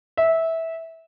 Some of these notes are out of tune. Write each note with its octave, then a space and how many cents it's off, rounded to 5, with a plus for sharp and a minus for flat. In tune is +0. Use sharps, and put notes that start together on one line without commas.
E5 -15